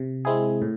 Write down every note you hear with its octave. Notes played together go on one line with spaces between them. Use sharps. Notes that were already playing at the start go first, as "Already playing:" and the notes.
Already playing: C3
G#3 C4 E4 G#4
A2